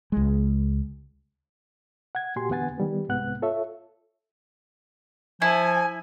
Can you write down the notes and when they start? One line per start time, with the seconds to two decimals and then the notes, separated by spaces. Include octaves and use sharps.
0.12 C#2 G#3
2.15 F#5 G#6
2.36 A#2 F#4 G4 G#5 C6
2.49 E2 D3 B3 F#5 G#5 A6
2.78 D#3 G3 B3
3.09 C2 G#2 C3 B3 F#5 F#6
3.42 F4 A4 C#5 E5
5.42 F3 E4 G#5